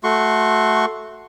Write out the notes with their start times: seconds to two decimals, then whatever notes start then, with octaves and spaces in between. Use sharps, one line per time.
0.04 A3 F#4 C6 C#6